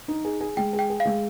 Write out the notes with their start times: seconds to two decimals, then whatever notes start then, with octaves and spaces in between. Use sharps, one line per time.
0.08 D#4
0.25 G#4
0.41 G#4
0.57 G#3 G5
0.73 G#4
0.79 G5
0.90 G#4
1.00 F5
1.05 G#3